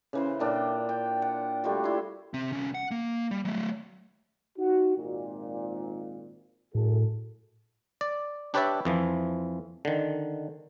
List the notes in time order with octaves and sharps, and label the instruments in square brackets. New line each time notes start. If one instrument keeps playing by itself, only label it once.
[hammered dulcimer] C#3 E3 C5
A#2 D4 G5
G5
F#5 G5
G3 A3 F4 F#4
E4 C6
[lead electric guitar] C3 C4
C2 C#4
F#5
A#3
G3
F#3 A3
[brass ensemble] D#4 F#4
G#1 A#2
[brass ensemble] F#2 G#4 A4 [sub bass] A2
[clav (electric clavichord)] D5
D4 G4 B4 C#5 D5 E5
F2 E3 F3
D3 D#3